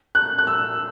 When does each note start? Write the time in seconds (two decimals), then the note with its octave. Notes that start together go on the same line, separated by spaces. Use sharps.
0.15 F#6
0.38 F#6
0.47 E6